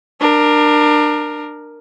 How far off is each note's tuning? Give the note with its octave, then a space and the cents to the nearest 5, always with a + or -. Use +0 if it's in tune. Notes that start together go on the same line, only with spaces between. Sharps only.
D4 +25 A#4 +0